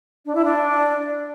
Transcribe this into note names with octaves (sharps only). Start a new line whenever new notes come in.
D4
E4
D4